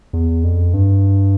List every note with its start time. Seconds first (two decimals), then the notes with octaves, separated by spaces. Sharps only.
0.13 E2
0.44 F2
0.74 G2